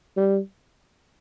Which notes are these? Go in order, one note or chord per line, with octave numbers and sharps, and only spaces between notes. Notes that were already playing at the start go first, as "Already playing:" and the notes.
G3